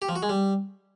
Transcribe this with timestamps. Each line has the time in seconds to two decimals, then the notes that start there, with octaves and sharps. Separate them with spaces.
0.02 G4
0.09 F3
0.16 F#4
0.23 G#3
0.29 G3